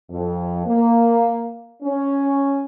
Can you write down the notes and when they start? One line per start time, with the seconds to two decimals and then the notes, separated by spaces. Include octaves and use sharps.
0.10 F2
0.66 A#3
1.83 C#4